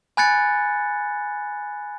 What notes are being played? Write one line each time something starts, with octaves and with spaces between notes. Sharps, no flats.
G#5 B5 F#6 G#6 A6 C#7